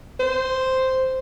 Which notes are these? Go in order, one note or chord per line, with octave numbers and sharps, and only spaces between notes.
C5